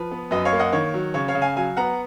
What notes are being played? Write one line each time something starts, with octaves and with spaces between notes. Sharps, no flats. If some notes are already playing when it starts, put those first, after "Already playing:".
Already playing: F3 B4
B3
F#2 B4 D#5
C#5 F5
A#3
D#5 F#5
D#3 C#5
F#3
C#3 C#5
C#5 F5
C#3
F5 G#5
F#3 F5 G#5
B3 F#5 A#5